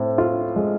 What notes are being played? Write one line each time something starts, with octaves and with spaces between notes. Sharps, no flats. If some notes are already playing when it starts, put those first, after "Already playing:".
Already playing: A2 C4
F4
G#3